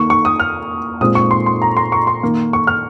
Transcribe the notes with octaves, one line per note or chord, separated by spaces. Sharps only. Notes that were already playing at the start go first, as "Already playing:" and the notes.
Already playing: D#3 A#3 C#6
C#6
D#6
F6
A#2 G#3 C4 D#6
C#6
C6
C6
A#5
C6
C#6
C6
D#3 A#3
C#6
F6